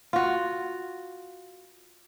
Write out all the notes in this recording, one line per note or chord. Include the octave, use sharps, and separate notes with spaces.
F4 F#4